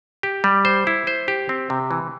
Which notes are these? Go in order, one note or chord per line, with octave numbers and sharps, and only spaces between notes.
G4
G3
C5
E4
C5
G4
C4
C3
E3